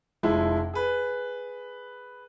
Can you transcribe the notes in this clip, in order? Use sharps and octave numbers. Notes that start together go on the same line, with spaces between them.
F1 F3 G#3 E4
G#4 B4